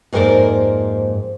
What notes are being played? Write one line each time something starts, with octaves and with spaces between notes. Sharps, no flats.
F2 G#2 A#3 A#4 C5 D5